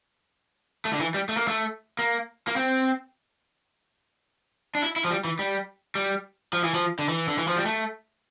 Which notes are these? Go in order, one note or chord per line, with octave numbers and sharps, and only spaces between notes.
A3
D3
E3
G3
A3
A#3
A3
A#3
A#3
C4
D4
E4
E4
F3
G3
E3
G3
G3
F3
E3
F3
D3
E3
D3
E3
F3
G3
A3